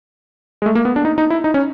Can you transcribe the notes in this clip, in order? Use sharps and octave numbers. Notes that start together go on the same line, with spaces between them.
G#3
A3
A#3
B3
D4
D#4
D#4
E4
D#4
C#4